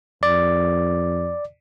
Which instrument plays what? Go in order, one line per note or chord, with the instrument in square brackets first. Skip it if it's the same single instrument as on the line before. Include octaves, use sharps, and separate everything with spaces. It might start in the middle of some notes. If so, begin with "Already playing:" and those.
[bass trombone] F2 [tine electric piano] D5